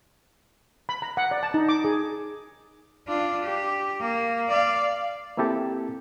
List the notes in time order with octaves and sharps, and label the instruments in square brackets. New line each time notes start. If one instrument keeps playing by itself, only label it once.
[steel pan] B5
A#5
F#5
D5
A5
D#4
D6
G#4
[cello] D4 F4
G4
A#3
D5 F5
[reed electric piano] A#3 C4 E4 G4 A4